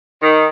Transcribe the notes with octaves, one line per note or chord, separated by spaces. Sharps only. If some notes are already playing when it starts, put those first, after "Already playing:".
D#3